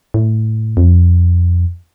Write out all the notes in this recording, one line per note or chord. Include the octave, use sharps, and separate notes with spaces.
A2
F2